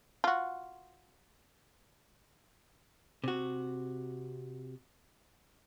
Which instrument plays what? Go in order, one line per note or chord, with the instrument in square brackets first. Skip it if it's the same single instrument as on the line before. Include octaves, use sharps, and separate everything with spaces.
[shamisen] F4 F#4
[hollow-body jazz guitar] C3 F#4